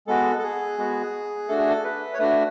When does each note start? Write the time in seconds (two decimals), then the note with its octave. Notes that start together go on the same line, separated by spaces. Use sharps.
0.07 G#3 B3 F#4 A4
0.39 A4
0.43 G#4
0.78 G#3 B3 F#4
1.48 A3 D4 F#4 A4
1.59 G#4
1.69 A4
1.84 B4
2.14 C#5
2.19 A3 D4 F#4 B4